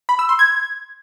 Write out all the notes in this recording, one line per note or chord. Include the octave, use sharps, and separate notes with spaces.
B5
E6
C6
G#6